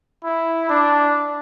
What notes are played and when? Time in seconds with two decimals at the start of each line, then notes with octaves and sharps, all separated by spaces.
0.24 E4
0.69 D4